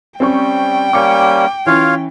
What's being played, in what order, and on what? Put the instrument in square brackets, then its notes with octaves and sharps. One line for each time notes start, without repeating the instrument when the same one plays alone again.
[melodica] G3 [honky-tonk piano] C4 C#4 C#6 [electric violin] G5
[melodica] G3 A#3 C#4 [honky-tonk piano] D6 C#7
[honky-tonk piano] E3 C#4 [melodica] F4 C#5 F5